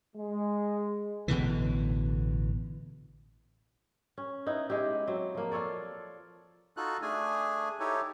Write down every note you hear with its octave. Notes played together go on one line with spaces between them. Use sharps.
G#3
A1 B2 D3 E3
C#4
B3 D#4 E4
G#3 E4 G4
F#3 C4
F3 A#3
F4 A4 C#5 D5
D#4 F4 F#4 A4 F#6
A3 D4 G#4 G#5
D#4 E4 G4 A4 C#5